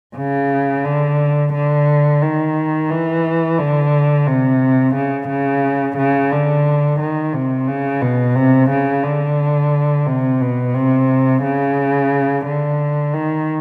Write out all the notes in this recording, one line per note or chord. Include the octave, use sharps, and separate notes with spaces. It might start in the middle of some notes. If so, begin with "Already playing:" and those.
C#3
D3
D3
D#3
E3
D3
C3
C#3
C#3
C#3
D3
D#3
C3
C#3
B2
C3
C#3
D3
C3
B2
C3
C#3
D3
D#3